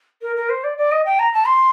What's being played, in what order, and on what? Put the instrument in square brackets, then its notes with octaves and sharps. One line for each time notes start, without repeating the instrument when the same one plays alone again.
[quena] A#4
A#4
C5
D5
D5
D#5
G5
A#5
A5
C6